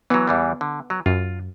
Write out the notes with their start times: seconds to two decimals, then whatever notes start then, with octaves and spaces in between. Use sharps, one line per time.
0.10 E3 F#3 B3
0.28 E2 E3 G3
0.61 D3
0.90 F#3
1.06 F#2 F4